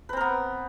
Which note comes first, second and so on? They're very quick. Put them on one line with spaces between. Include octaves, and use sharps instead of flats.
B4 C4 A#4 B3